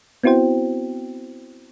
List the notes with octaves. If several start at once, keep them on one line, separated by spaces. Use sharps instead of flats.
B3 C4 E4 F#4 C5 G5